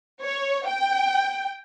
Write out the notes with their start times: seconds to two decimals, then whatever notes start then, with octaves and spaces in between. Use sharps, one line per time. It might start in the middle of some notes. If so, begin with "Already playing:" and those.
0.22 C#5
0.66 G5